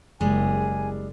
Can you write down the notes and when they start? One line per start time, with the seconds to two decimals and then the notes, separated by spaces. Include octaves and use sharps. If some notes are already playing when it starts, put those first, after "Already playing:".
0.21 F#1 G3 G#3 G#5